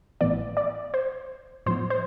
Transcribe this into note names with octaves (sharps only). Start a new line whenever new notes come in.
A1 A2 E3 B3 D5
D5
C5
A2 F3 B3 C5
C5